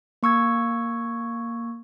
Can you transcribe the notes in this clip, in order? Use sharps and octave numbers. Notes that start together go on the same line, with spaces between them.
A#3 C#6 E6 G#6